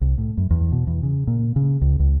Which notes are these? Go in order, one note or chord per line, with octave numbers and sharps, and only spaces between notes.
C2
A2
F#2
E2
B2
E2
C#3
A#2
C#3
C#2
C#2